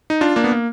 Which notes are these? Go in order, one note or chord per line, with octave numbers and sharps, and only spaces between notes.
D#4
D4 F4
A#3 D4
B3
A#3